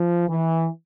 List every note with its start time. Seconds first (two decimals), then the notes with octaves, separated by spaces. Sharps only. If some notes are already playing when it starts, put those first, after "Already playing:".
Already playing: F3
0.28 E3